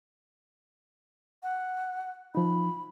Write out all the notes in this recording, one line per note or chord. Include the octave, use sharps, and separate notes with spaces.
F#5
F3 D#4 B5